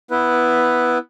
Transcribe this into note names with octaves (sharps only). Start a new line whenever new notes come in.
B3 E4 B4